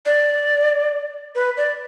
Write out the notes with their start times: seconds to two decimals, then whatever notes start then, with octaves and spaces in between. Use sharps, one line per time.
0.06 D5
1.35 B4
1.57 D5